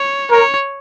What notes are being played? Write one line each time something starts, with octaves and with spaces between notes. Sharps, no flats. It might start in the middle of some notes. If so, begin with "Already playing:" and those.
Already playing: C#5
A#4 C#5